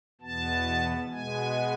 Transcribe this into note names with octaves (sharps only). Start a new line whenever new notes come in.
E2 B2 B3 A5
B2 G#3 B3 G#5